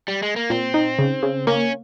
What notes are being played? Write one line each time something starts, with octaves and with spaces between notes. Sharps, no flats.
G3
G#3
A#3
A#2 C4
D#4
C#3
C#3
A#3 C#4